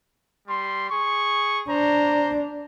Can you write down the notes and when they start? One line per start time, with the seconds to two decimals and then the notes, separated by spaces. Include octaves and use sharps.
0.48 G3 C6
0.91 G#4 C#6
1.69 D4 C5 A#5